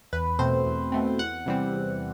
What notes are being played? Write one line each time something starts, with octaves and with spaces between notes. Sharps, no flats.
E2 B4
B2 A3 C4 C5
E2
B2 A3 C4
E2 F#5
C3 E3 G3 C4
E2